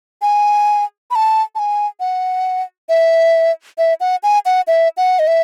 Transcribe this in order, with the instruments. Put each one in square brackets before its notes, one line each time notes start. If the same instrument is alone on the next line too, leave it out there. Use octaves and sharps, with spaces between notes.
[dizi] G#5
B5
A5
A5
G#5
F#5
E5
E5
F#5
G#5
F#5
E5
F#5
D#5
E5